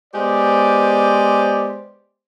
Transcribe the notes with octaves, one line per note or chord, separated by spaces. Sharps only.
G#3 B3 G4 C5 D5